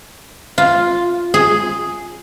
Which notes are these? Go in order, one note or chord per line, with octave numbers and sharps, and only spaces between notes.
F4
G#4